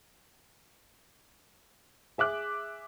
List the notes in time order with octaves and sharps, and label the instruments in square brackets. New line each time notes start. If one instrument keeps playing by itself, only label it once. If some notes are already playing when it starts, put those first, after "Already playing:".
[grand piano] G#4 E5 D6 F#6